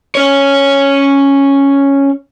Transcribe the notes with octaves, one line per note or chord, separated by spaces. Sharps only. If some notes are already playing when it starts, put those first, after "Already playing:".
C#4 C#5